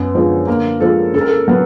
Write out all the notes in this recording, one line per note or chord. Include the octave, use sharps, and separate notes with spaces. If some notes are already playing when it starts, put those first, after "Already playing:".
Already playing: F#2 B3 B4
D3 F3 G#3
D3 A#3 A#4
F3 G#3 A4
C#3 A4
A#4
A4
F#3 B3